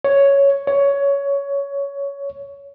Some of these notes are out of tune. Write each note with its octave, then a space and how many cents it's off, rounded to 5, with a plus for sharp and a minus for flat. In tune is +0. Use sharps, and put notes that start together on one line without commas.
C#5 +5
C#5 +15